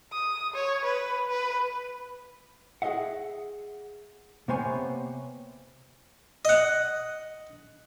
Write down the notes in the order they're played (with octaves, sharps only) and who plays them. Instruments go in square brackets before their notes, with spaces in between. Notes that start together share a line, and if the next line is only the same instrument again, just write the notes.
[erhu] D#6
C#5
B4
B4
[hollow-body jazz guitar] G#4 A4 D#5 E5 F#5
C3 A#3 B3 C5 C#5 G#5
[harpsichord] D#5 F#5